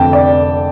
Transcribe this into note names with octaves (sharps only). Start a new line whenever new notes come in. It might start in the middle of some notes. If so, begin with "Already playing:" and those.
Already playing: F1 F2 D3 G5 A5
D5